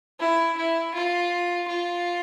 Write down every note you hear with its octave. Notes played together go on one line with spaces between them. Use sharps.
E4
E4
F4
F4